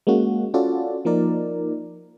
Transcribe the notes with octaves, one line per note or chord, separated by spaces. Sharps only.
G#3 A#3 C#4 F#4
C#4 F4 F#4 A4 D5
F3 A#3 D#4 A#4 D5